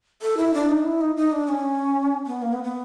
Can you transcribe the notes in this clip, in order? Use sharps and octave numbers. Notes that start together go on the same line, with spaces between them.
A4
E4
D4
D#4
E4
D#4
D#4
D4
C#4
B3
A#3
B3
B3